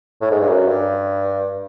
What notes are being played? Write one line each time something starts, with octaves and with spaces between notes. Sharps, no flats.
A2
G#2
G2
F#2
G2